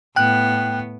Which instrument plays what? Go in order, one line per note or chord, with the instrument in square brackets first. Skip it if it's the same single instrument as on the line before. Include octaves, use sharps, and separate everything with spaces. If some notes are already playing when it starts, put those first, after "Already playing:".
[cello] A2 B3 [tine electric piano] G5 F#6